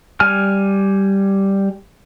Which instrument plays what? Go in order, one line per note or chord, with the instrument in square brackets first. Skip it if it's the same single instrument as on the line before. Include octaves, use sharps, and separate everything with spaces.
[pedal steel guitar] G3 G#5 F6